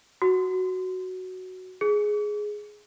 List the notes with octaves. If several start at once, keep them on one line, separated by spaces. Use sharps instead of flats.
F#4
G#4